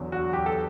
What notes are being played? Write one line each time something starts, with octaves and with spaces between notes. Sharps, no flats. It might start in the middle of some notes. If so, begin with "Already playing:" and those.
Already playing: E2 D3 F#3
F#4
G4
A4